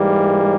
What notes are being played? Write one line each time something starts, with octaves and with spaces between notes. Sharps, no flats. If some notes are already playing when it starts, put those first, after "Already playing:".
Already playing: G#2 E3 G3 A#3